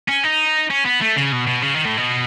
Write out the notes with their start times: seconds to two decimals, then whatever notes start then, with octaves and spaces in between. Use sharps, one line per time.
0.09 C#4
0.24 D#4
0.70 C#4
0.85 B3
1.01 A3
1.16 C#3
1.32 B2
1.47 B2
1.62 C#3
1.75 D#3
1.85 A2
1.97 B2